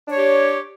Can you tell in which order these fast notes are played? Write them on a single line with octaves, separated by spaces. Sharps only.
D4 C#5 G4